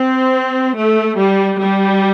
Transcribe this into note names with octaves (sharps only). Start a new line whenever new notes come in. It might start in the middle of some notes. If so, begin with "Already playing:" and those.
Already playing: C4
A3
G3
G3